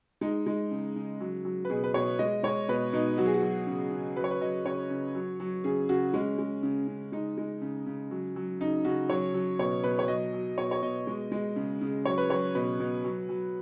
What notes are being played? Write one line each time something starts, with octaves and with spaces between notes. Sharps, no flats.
G#3 D#4
G#3
C#3
C#3
F#3
F#3
B4
B2 G#4
B4
B2 C#5
G#3 D#5
G#3 C#5
B2 B4
B2 D#4
F#3 F#4
G#4
F#4
F#3
C#3
C#3
F#3 B4
C#5
B4
F#3 D#5
C#3 C#5
C#3
F#3
F#3
C#3 G#4
C#3 F#4
G#3 C#4
G#3
C#3
C#3
G#3 D#4
G#3
C#3
C#3
F#3
F#3
C#3 D#4
C#3 F#4
F#3 C#5
F#3
B2 C#5
B2 B4
C#5
F#3 D#5
F#3
B2 C#5
C#5
B2 D#5
G#3
G#3
C#3
C#3
F#3 C#5
B4
F#3 C#5
B2 B4
B2
F#3
F#3